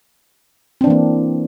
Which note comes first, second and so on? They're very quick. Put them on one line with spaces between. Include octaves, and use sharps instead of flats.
C4 D4 E3 A#3